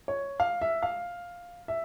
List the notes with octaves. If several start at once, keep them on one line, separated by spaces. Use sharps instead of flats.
C#5
F5
E5
F5
E5